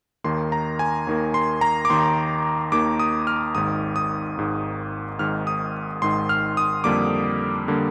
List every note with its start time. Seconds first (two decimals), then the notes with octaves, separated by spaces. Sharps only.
0.24 D#2 D#3 A#3 C6
0.52 A#5
0.79 G#5
1.07 D#2 D#3 A#3
1.34 C6
1.61 A#5
1.85 D6
1.90 D#2 D#3 A#3 C6
2.72 D#2 D#3 A#3 D6
2.99 D#6
3.27 F6
3.55 G#1 G#2 D#3 D#6
3.96 D#6
4.37 G#1 G#2 D#3
5.19 G#1 G#2 D#3 F6
5.47 D#6
6.02 G#1 G#2 D#3 C6
6.29 F6
6.57 D#6
6.84 F2 D3 G3 A#3 D6
7.68 D3 G3 A#3